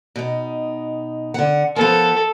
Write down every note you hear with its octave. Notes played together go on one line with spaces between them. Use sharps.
B2 D#4
D3 F#5
F3 B3 A4 A#4